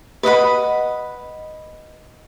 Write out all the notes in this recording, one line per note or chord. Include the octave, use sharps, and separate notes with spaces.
B4 D#5 F#5 B5